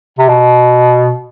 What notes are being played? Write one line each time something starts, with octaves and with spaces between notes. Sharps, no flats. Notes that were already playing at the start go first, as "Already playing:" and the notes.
C3
B2